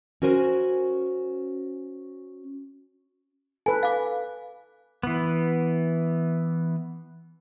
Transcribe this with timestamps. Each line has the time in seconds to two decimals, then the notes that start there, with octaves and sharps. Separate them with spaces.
0.22 C#4 F#4 A#4 C5 G#5
3.66 A4 B4 G#5
3.83 F5 D6
5.03 E3 B3